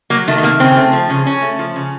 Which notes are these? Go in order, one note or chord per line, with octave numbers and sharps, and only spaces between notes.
F#3 A#3
D#3 A3
A3
C3 A#3
C#3 C4
A3
F3
C#3
C#3 C#4
A3
F3
C#3